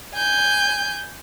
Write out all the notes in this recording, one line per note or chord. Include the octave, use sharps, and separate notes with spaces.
G#5 G6